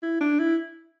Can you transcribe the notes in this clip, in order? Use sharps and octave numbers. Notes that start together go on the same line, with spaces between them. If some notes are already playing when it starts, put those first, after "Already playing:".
E4
D4
E4